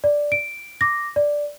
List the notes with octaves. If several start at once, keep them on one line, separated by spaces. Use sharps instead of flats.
D5
D7
D6 A#6
D5